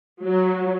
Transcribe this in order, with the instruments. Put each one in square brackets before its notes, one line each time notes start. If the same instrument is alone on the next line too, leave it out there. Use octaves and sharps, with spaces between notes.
[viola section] F#3